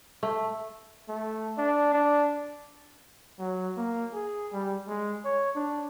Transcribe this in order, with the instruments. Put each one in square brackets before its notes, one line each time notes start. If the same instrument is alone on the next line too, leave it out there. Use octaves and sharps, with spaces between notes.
[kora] A3
[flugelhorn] A3
D4
D4
F#3
A#3
G#4
G3
G#3
C#5
D4